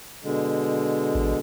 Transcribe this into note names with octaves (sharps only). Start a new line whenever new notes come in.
B2 D3 G#3
A1